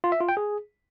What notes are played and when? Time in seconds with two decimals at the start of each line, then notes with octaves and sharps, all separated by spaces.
0.04 F4
0.12 E5
0.20 F4
0.29 G5
0.37 G#4